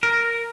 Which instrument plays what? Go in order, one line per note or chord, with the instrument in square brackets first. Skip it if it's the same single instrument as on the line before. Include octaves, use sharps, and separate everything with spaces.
[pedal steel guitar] A#4